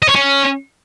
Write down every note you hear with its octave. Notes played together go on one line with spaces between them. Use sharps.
D#5
C#5
C#4